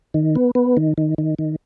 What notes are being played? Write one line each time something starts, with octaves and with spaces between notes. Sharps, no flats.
D#3
B3
B3
D#3
D#3
D#3
D#3